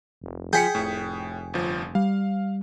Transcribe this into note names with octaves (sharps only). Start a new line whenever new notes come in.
F1
F3 G#4 F#5 G5 G6 B6 C#7
F1 A2
G1 F3
G3 F5